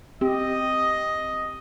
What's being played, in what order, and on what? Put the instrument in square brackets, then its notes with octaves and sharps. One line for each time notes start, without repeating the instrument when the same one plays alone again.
[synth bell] C4 [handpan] G4 [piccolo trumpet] D#5